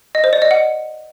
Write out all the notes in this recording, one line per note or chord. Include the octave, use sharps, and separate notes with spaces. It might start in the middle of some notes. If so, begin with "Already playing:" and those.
D#5
C5
D5
D#5
F#5